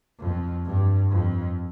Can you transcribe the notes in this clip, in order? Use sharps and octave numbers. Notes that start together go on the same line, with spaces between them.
F2
G2
F2